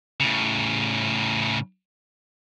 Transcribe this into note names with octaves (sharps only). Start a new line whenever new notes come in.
A2 C#3